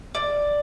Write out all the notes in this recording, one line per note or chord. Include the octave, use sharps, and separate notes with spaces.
D5